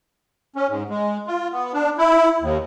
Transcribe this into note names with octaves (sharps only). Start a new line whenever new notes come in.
C#4
G#2
G#3
F4
B3
D4
E4
D#2